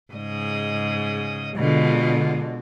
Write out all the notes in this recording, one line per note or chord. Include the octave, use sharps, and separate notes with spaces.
G#2 C#3 D#5
B2 D3 G#3 F4